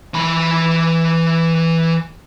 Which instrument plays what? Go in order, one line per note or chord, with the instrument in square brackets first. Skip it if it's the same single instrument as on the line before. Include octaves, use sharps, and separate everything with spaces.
[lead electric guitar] E3 B5